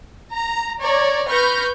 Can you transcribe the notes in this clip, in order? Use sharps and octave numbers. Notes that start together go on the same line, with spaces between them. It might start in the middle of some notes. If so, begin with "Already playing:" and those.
A#5
C#5 D5 A#5
B4 B5 C#6 F6 G6 A#6